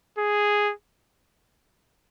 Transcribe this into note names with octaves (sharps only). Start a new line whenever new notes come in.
G#4